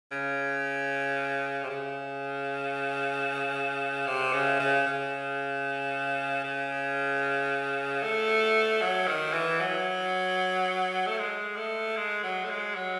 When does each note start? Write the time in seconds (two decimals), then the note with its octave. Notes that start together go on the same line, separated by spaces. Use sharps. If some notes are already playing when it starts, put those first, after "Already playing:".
0.12 C#3
1.63 C3
1.70 C#3
4.07 C3
4.33 C#3
4.60 C#3
4.87 C#3
6.44 C#3
8.03 A3
8.81 F#3
9.07 D#3
9.33 E3
9.60 F#3
11.07 A3
11.19 G#3
11.57 A3
11.97 G#3
12.23 F#3
12.44 A3
12.50 G#3
12.76 F#3